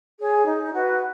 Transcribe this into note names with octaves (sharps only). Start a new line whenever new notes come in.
G#4 C#5
D#4
F#4 B4